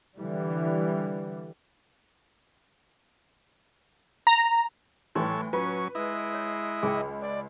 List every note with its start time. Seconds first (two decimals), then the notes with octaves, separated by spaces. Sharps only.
0.17 D3 E3 G3
4.27 A#5
5.15 A2 E3 G3 A4 C#5 C6 C#6
5.53 F#3 C#4 F4 B4 C#6
5.95 G#3 E4 D#5
6.34 C#5
6.83 C#2 G#4 G5
7.21 D5